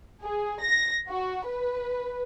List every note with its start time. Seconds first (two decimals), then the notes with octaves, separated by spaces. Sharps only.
0.21 G#4
0.61 A#6
1.09 F#4
1.46 B4